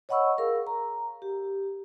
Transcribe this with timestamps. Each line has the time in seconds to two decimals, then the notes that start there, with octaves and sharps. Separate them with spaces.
0.09 C#5 D#5 F#5 B5 C#6 E6
0.38 G#4 A#4 F5
0.67 A#5
1.22 G4